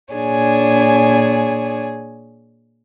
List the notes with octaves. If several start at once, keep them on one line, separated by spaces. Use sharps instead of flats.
A#2 D4 G#4 C#5 G#5